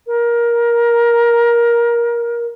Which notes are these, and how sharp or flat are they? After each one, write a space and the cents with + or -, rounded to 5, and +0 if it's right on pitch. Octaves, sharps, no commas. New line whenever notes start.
A#4 +15